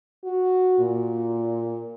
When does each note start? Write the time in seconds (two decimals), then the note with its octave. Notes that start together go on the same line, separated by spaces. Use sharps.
0.24 F#4
0.79 A#2